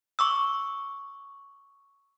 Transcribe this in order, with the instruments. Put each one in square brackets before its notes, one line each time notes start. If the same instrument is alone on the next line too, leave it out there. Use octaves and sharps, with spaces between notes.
[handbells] C#6 D6 E6